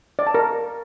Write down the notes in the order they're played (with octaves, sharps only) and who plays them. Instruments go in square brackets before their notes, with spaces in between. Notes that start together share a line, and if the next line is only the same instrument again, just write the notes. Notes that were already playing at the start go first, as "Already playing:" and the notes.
[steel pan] D5
A5
A#4